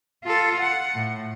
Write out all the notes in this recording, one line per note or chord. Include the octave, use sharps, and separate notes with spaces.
F4 A4
F#5
A2